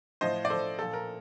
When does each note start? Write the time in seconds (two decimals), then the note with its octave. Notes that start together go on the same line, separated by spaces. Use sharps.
0.21 A2 F3 C5 D#5
0.45 D5
0.50 A2 F3 A4 C5
0.79 A#2 F3 A4
0.93 A#4